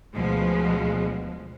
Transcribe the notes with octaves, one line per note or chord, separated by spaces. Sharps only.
D2 B2 F3 G#3